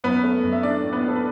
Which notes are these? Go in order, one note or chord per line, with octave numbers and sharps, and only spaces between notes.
F#2 B3 B4
A3
F#2
E5
A3 D4 D5
A2
B3 B4
A2
A4
B4